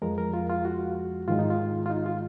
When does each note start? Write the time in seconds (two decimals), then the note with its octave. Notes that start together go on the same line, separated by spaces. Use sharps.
0.02 F2 F3 G#3 A#4
0.18 A#4
0.34 F4
0.50 F4
0.65 F#4
1.28 G#2 D#3 G#3 F4
1.39 D#4
1.50 F4
1.86 F4
1.90 D#4
2.06 F4